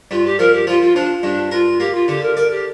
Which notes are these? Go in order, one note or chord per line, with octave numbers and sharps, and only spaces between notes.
G2 F4
G4
F3 A#4
G4
F3 F4
F4
F3 D4
G2 D4
F4 A#4
A#3 G4
F4
D3 G4
A#4
A#4 D5
G4